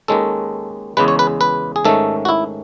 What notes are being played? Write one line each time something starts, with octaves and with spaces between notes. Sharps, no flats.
D#2 D#3 G#3 C#4 A4
E2 C#3 G#3 B4
C#5
B4
B4
G#4
G#2 D#3 A3 C#4 A4
F#4
E4